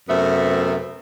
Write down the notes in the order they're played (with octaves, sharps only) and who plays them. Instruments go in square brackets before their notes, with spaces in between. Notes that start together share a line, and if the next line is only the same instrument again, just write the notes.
[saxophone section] F#2 C3 A3 B3 C5 E5